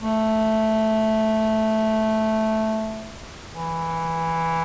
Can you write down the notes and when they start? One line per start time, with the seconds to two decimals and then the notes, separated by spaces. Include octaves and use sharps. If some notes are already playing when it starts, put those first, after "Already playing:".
0.03 A3
3.53 E3